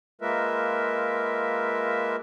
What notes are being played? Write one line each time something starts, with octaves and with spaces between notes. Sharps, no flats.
G#3 A#3 F4 A#4 B4 E5